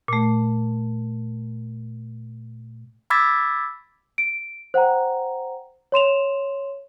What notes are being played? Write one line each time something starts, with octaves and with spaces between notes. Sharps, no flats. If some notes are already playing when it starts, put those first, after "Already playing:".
A#2 A3
B5 D6 E6 G#6 A6 B6
D7
C5 F#5 G5 A#5
C#5 C6 E7 F7